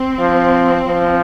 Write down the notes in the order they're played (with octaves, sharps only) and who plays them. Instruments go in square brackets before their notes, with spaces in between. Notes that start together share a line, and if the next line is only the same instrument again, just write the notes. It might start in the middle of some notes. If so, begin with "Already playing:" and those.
Already playing: [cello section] C4
[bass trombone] F3
F3